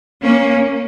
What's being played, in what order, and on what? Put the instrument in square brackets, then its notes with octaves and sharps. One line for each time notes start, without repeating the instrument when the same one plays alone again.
[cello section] A#3 C#4